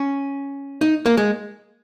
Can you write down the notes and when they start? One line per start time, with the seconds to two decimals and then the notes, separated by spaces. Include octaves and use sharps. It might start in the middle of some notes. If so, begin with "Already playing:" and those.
Already playing: C#4
0.81 D#4
1.06 A#3
1.17 G#3